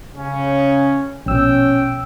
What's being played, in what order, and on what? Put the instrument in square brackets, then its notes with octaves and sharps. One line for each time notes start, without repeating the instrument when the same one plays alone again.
[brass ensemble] C#3 C#4
[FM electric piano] A#1 B2 E6 [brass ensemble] C#4 G5